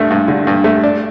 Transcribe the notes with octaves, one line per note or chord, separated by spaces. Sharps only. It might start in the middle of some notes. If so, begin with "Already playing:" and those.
Already playing: G2 A3
G2
D3
G2
A3
D4